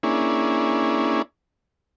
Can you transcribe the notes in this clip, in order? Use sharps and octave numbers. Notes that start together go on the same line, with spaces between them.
A#3 C#4 D4 E4 G#4